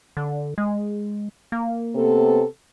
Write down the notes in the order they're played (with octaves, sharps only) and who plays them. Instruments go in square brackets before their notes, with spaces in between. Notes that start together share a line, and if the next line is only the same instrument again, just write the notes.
[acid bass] D3
G#3
A#3
[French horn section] C3 B3 A4